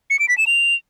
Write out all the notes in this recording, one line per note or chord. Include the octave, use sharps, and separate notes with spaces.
C#7
D7
B6
E7
F7